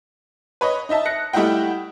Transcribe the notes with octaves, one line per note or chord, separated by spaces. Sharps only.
B4 C#5 D#5
D#4 D#5 E5 A5
F#6 A#6 C#7
G3 A3 E4 D#5 F#5 G5